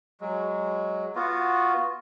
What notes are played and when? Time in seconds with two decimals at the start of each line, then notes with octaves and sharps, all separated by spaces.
0.21 F#3 G#3
1.15 B3 F4 F#4